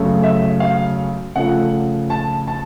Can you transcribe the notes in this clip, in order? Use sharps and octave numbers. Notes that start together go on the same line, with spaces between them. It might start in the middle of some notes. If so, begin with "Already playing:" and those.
Already playing: F#2 C#3 F#3 A3
E5
F5
C#3 F3 A3 F#5
A5
A5